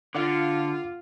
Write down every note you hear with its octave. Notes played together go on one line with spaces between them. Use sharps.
D3 F4 F5 F#5 D6